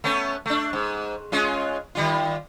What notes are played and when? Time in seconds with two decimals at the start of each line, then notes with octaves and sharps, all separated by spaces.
0.04 A3 B3 C#4
0.46 A3 D4
0.73 G#2
1.32 G#3 C#4 F4
1.95 D#3 G3 F4